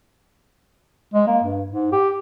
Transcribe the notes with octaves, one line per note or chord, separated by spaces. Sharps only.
G#3
A#3
G2
G#2
G4